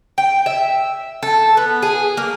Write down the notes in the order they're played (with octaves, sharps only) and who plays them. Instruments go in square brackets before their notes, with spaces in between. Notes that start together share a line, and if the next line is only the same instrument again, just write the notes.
[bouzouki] G5
E5
A4
B3
G#4
A#3